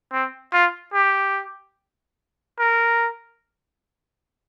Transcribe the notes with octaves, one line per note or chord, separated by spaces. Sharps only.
C4
F4
G4
A#4